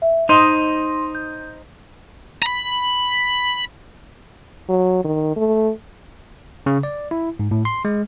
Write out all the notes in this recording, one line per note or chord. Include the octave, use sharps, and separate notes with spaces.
E5
D#4 C5 D#5 C6
G6
A#5 B5
F#3
D#3
A3
C#3
D5
E4
G#2
A2
C6
G#3